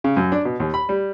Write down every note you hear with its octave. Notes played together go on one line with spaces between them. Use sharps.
C#3
F#2
D4
B2
D#2
B5
G3